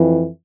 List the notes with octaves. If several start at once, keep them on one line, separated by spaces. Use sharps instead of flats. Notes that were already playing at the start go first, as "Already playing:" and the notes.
Already playing: F2 E3